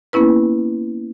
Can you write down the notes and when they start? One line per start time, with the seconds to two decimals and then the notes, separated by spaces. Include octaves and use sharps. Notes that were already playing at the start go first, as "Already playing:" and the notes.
0.13 A#3 B3 C#4 E4 B4